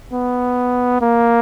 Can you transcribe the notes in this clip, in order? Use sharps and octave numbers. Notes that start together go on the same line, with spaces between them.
B3
A#3